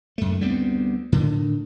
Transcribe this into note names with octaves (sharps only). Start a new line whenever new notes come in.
F#2 A3
D2 G3 B3 C4
A2 D3 D#3